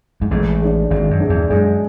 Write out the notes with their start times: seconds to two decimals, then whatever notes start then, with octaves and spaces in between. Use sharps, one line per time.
0.21 G#2
0.31 A1 A2 G#3
0.61 D4 G#4
0.90 G#1 G#2 G#3
1.11 F#2
1.20 D4 G#4
1.29 E2
1.50 F#2 G#3